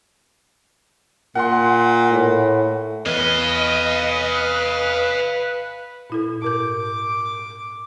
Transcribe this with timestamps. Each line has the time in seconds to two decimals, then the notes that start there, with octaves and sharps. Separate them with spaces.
1.35 A#2 F#5 C6
2.10 A2
3.06 E2 B4 D#5 F5 G#5
6.10 A#2 E4 A4
6.42 G#2 A#4 D6 G6